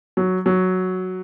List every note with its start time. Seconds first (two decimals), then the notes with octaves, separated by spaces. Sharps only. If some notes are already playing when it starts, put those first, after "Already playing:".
0.17 F#3
0.46 F#3